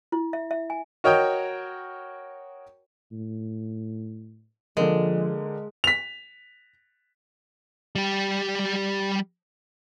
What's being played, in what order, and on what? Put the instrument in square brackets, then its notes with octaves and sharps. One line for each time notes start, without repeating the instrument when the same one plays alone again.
[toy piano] E4
E5
E5
G#5
[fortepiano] F#4 A#4 C#5 D#5 G5
[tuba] A2
[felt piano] D3 A#3 [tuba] F3 [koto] G#3
[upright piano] B6 F7
[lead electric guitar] G3 G4